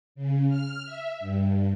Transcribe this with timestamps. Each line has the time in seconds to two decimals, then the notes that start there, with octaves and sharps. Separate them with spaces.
0.15 C#3
0.49 F6
0.85 E5
1.20 G2